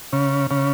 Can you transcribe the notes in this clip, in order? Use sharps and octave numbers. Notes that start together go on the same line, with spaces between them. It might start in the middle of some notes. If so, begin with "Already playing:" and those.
C#3
C#3